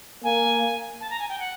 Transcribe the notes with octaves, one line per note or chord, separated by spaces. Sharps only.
A#3 G#5
A5
A#5
G#5
G5
F#5